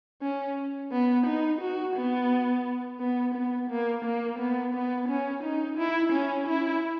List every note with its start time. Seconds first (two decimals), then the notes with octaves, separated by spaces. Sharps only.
0.22 C#4
0.92 B3
1.27 D#4
1.61 F#4
1.95 B3
3.00 B3
3.34 B3
3.70 A#3
4.05 A#3
4.39 B3
4.74 B3
5.08 C#4
5.43 D#4
5.77 E4
6.12 C#4
6.48 E4